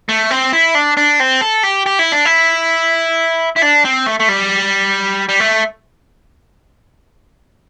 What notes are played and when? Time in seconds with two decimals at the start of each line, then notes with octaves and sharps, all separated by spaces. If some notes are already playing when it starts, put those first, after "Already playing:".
0.09 A3
0.30 C4
0.53 E4
0.75 D4
0.97 D4
1.20 C4
1.41 A4
1.63 G4
1.86 G4
1.99 E4
2.12 D4
2.25 E4
3.57 E4
3.63 D4
3.85 C4
4.06 A3
4.19 A3
4.28 G3
5.29 G3
5.40 A3